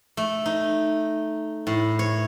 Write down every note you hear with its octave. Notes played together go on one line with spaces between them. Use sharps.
A3
D#4
A2
C#5